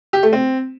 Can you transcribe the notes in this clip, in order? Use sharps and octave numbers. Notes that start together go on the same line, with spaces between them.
G4
A3
C4